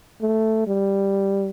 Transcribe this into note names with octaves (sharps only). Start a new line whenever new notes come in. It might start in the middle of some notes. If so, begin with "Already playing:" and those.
A3
G3